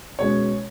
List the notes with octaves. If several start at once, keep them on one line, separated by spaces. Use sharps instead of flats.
B2 G#3 C#4 C#5